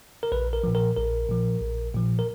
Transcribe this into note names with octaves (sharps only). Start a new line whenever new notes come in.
A#4
A#1 B4
A#4
A#2 F3
A#4
A#1 A#4
A#2 F3
A#1
A#2 F3
A#4